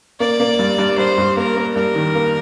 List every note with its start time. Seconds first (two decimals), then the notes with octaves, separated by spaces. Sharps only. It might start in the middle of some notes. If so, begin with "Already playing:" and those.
0.20 A#3 D5
0.40 A#3
0.59 G2
0.79 G2
0.98 G2 C5
1.18 G2
1.37 A#3 A#4
1.56 A#3
1.76 G2 A#4
1.95 D#3
2.15 A#3